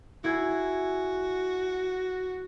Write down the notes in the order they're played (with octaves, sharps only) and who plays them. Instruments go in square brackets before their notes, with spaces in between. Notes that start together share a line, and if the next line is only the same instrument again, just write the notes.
[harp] E4 G#4 G#6 [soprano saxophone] F#4